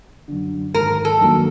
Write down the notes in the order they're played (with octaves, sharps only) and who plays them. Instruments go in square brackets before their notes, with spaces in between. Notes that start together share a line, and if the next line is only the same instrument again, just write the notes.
[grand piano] F#2 D3
[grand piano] G#1 [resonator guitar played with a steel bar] A#4
[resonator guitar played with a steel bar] A4
[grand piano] G2 D#3 F#3 A#3